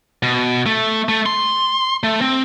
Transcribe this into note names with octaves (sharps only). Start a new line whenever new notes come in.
B2
A3
A3
C6
A3
C4